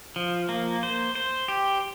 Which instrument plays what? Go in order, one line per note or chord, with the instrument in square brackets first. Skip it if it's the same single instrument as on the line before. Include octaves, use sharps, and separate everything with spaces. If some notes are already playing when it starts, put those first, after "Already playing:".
[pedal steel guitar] F3
A#3
C5
C5
G4